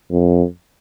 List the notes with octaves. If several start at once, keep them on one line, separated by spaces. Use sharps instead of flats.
F2